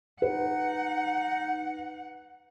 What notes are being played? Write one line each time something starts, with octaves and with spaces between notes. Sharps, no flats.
D#4 B4 F#5